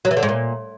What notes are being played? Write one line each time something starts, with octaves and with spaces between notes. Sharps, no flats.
F#3
E3
D3
G#2
A#2